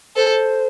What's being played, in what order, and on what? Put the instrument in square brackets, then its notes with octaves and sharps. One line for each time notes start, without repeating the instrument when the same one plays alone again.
[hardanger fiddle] A4 [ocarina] C5